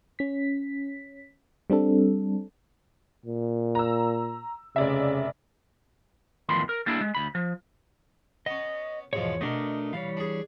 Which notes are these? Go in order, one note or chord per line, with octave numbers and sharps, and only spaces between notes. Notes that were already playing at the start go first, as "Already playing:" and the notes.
C#4 B6
G3 C4 D4 A4
A#2
A#5 E6
F1 C#3 D5 E5
E2 A2 D#3 F3 B5 C6
A#4
G3 A#3 D4 E4
G#3
D2 B5
F3
B3 C#4 D#5
E2 G#2 B2 F3 C#5
B2 A3 D4 A#4 D#5
E3 G3 C#5 F5
D4 G#4